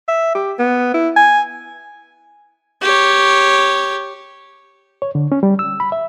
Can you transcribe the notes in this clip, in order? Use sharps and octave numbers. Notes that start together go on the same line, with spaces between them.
E5
G4
B3
E4
G#5
G4 C#5
C#5
D3
C#4
G3
E6
B5
E5